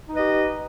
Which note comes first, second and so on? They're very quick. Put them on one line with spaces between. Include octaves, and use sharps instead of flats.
D#4 B4 D#5 G4